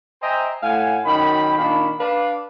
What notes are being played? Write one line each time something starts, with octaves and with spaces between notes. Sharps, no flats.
C5 D#5 E5 G5 G#5 A#5
A2 F5 F#5 G#5
F#2 D#3 G5 B5
A#2 D#3 D4 F5 B5
D4 B4 D5 F5